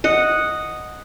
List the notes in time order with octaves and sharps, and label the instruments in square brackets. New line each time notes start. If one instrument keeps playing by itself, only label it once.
[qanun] D#5 F#5